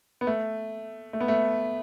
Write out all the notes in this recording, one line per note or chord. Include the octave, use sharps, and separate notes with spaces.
B3
A3
A3
B3
A3